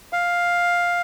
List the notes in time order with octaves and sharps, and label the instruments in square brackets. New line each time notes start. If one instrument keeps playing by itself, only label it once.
[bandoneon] F5